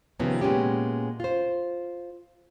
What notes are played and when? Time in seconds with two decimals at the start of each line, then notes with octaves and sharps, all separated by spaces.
0.19 C3 D#3 F3 G#3 B3 C#4
0.41 A#2 G#3 B3 C#4 G4
1.20 F4 C5